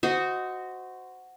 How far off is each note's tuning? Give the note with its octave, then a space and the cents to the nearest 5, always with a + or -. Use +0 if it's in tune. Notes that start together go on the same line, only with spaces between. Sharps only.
F#4 +0 C5 -20 D#5 +10